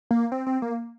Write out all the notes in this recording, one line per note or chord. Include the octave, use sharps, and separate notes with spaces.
A#3
C4
C4
A#3